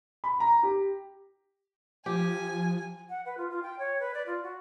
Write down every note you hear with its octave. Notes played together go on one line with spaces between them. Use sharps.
B5
A#5
G4
F3 G4 G#5
F#5
B4
F4
F4
G5
C#5
B4
D5
F4
F#4